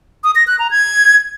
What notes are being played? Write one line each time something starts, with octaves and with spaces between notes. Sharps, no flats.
D#6
A#6
F#6
A#5
G#6